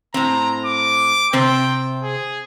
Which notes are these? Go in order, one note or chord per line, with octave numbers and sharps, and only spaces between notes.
A2 C4 A#5
D6
C3 C4 G5
G#4